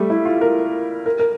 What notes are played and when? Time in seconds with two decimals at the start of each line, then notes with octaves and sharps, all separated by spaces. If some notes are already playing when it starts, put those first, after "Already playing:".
Already playing: G3 A3
0.10 E4
0.25 F4
0.41 A#4
1.06 A#4
1.19 A#4